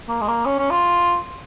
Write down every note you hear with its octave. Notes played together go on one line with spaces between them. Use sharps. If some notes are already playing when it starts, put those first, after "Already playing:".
A#3
G#3
A#3
C#4
C#4
F4